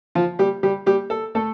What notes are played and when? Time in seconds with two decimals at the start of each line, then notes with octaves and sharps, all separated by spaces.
0.15 F3 F4
0.39 G3 G4
0.63 G3 G4
0.86 G3 G4
1.10 A4
1.35 A3 A4